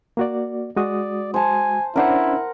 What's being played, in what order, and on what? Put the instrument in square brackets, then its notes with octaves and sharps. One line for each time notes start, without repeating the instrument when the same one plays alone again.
[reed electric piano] A#3 F#4 D5
[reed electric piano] G#3 F#4 D#6 [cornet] D5
[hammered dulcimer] C5 A5 [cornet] G#5
[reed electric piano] C#4 D4 C5 [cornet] E4 [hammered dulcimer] A#4 F#5